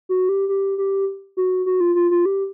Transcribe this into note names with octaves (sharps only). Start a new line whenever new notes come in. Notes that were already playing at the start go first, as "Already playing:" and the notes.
F#4
G4
G4
G4
F#4
F#4
F4
F4
F4
G4